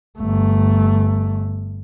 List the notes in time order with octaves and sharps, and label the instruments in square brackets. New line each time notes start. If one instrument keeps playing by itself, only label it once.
[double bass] G1 A3